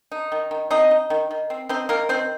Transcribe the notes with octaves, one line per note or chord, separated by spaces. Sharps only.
D#4
D#3
D#3
C4 D#4 D#5
D#4
D#3
D#3
C4
C4 D#4 C5
D#3 A#3 A#4
D#3 C4 C5